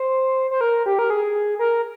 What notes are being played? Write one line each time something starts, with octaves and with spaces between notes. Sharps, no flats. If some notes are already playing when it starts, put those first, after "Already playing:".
Already playing: C5
C5
A#4
G4
A#4
G#4
A#4